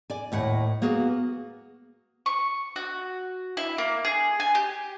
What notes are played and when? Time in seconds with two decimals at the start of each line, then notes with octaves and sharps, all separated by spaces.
0.10 D5 G#5
0.32 D#2 A2 F#5
0.82 A#3 B3 F#4 G#4
2.26 C#6
2.76 F#4
3.57 E4
3.78 A#3
4.05 G#4
4.40 G#5
4.55 G4